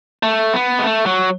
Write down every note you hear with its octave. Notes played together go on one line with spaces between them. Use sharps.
A3
B3
G#3
A3
F#3